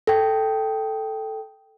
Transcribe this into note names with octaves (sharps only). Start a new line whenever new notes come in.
A4 G5